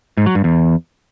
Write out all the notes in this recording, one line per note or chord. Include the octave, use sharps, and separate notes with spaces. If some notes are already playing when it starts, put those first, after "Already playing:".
G#2
F#3
G2
E2